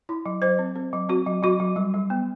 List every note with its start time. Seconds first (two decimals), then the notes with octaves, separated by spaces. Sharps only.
0.09 E4
0.26 F#3
0.42 F#3 C5
0.59 C4
0.76 C4
0.93 F#3
1.09 C4 F#4
1.26 F#3
1.43 F#3 F#4
1.60 F#3
1.76 G3
1.94 G3
2.10 B3